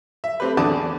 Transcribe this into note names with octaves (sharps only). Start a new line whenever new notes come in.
E5
A3 C4 G4 B4
E2 D3 D5 A5 D6 D#6